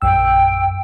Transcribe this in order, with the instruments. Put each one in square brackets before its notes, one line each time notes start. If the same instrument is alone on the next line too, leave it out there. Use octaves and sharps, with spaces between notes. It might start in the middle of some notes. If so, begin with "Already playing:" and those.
[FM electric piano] A#1 F#2 E6 [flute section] G5